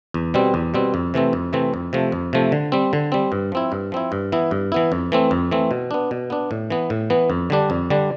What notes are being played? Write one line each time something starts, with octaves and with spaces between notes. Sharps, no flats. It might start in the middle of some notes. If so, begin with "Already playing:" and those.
E2
B2 G3 C4
E2
B2 G3 C4
F2
C3 E3 A3 C4
F2
C3 E3 A3 C4
F2
C3 F3 A3
F2
C3 F3 A3
D3
G3 C4
D3
G3 C4
G2
F3 C4 E4
G2
F3 C4 E4
G2
E3 B3 E4
G2
E3 B3 E4
F2
E3 A3 C4
F2
E3 A3 C4
B2
B3 D4
B2
B3 D4
A2
E3 B3
A2
E3 B3
F2
D3 G3 D4
F2
D3 G3 D4